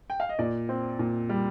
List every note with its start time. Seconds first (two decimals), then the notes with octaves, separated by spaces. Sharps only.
0.10 G5
0.20 F5
0.29 D#5
0.39 A#2 D5
0.69 C4
0.99 A#2
1.29 G3